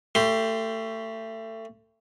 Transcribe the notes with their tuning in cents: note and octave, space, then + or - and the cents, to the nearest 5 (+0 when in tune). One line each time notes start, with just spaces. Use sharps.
A3 +25 G4 +0 C6 -10